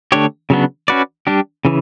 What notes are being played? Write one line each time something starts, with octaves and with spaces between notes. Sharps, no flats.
D3 A3 D4 G4 C#5
C#3 F#3 B3 D4
C#4 F#4 B4 D5
G3 D4 G4
C#3 E3